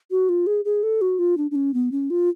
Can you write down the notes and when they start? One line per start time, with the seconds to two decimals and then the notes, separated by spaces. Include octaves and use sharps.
0.11 F#4
0.29 F4
0.47 G#4
0.65 G#4
0.83 A4
1.01 F#4
1.19 F4
1.37 D4
1.51 D4
1.55 C#4
1.74 B3
1.92 C#4
2.10 F4